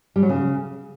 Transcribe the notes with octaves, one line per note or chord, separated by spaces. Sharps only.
G3
F#3
C#3